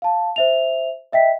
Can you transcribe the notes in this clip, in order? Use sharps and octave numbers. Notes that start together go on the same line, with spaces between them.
F5 A5
C5 E5 F7
D#5 E5 G5 B6